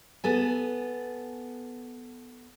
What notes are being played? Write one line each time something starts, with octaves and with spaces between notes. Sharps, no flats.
B3 A4 G#5